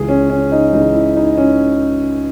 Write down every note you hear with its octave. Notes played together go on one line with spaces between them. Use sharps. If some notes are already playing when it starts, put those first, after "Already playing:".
Already playing: C#2 C#3 E3 G#4
C#4
C#4
D#4
C#2 C#3 E3 D#4
E4
D#4
C#4